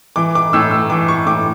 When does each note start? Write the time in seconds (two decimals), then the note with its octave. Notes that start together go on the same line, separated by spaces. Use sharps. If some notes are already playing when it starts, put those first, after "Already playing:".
0.16 E3 D6
0.35 D6
0.53 A2 E6
0.71 E6
0.90 E3 D6
1.08 C#6
1.26 A2 D6